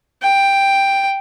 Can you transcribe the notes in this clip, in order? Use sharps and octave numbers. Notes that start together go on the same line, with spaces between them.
G5